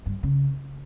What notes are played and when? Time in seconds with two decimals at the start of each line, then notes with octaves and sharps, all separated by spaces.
0.06 G2
0.23 C#3